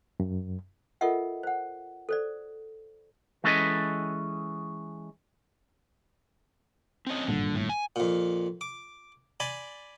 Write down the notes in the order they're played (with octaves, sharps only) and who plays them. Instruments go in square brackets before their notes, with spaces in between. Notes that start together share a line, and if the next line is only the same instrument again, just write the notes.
[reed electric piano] F#2
[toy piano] F4 A4 A#4 D#5 E5 F#5
C5 F#5
A4 C5 D5
[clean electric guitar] E3 G#3 C#4 A4 B4 D#5
[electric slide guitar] C4 C#4 D#5
[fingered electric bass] G#1 G2 A#2 [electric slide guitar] D3
[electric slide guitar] A2
G#5
[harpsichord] F2 A#2
D6
D5 G#5 B5 C6